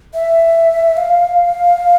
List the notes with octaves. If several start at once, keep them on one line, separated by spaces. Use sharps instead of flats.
E5
F5